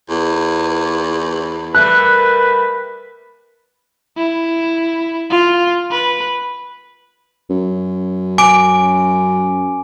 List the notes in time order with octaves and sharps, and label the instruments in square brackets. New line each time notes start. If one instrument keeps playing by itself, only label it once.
[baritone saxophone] E2
[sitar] G3 A3 A#3 [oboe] B4 [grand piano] F#6
[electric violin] E4
F4
B4
[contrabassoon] F#2
[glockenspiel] G#5 D6 D7